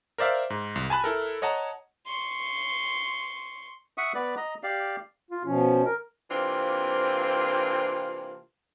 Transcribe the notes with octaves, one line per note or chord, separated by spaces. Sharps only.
A#4 C5 D5 E5 F5
G#2
C2
G#5 A5 B5 F#6
E4 A4 A#4
C#5 D#5 F#5 A5 A#5
C6 C#6
E5 F#5 C#6 D#6
B3 B4 D5
D#5 A#5
G4 D5 F5
F4
B2 F3 C#4
A#4
C3 E3 A#3 C4 D4 F4